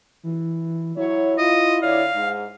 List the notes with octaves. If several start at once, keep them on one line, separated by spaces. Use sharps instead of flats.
E3
F#3 E4 C#5
F4 D#5
D3 C#5 D5 F5
G#2